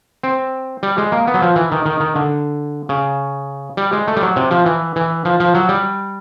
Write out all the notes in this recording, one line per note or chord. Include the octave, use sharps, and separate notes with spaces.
C4
G3
G#3
A#3
B3
F#3
F3
E3
D#3
D#3
D#3
D3
C#3
G3
G#3
A3
G3
F#3
C3
F3
E3
E3
F3
F3
F#3
G3